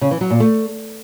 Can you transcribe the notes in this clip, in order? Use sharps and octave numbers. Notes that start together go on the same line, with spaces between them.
C#3
E3
F#3
A#2
A3